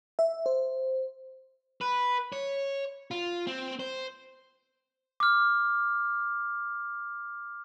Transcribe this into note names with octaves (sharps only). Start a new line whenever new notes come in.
E5
C5
B4
C#5
F4
C4
C5
D6 F6